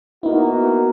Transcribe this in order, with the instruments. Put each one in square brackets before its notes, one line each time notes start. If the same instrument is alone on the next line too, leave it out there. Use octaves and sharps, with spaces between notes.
[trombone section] A#3 B3 F#4 [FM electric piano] D#4 E4